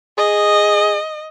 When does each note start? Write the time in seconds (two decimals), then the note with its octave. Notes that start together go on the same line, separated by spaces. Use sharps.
0.18 G#4 D#5